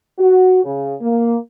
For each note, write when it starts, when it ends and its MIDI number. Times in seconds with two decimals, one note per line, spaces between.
0.19 0.64 66
0.64 0.94 49
1.01 1.36 58